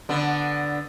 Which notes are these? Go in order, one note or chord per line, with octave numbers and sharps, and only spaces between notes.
D3 B3